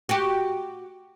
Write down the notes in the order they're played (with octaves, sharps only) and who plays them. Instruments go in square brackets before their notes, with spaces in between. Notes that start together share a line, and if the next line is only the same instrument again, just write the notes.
[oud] F#4 G4